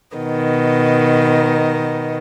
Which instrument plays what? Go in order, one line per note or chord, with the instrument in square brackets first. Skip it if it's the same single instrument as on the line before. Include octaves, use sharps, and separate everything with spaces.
[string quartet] B2 D#3 B3 D#5